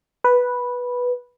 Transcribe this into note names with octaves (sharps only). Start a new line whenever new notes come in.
B4